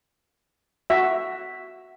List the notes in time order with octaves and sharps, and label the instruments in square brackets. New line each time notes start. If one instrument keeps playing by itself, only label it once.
[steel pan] F#4 E5